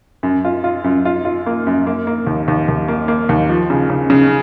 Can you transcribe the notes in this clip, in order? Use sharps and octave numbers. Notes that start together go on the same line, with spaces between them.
F#2
F4
F4
F#2
F4
F4
A#3
F#2
A#3
A#3
D#2
D#2
D#2
A#3
A#3
D#2
F3
C#3
C#3
C#3